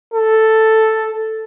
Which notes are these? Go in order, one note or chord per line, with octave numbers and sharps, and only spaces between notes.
A4